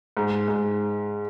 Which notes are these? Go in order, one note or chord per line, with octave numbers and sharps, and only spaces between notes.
G#2
G#2